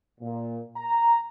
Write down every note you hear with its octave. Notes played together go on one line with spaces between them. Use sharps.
A#2
A#5